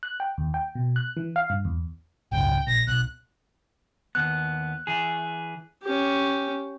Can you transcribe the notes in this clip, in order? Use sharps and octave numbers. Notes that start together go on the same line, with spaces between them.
F#6
G5
D#2
G5
B2
F#6
E3
F5
G2
E2
G#1 C#2 F#2 G5
A#1 A#6
B1 F#6
D#2 B3 F#6
E3 G#4
C#4 G4